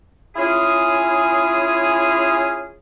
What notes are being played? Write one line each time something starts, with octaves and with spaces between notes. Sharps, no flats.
C#4 E4 F4 G#4